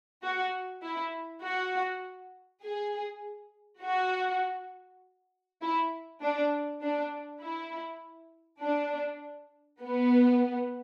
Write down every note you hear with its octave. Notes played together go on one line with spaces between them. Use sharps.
F#4
E4
F#4
G#4
F#4
E4
D4
D4
E4
D4
B3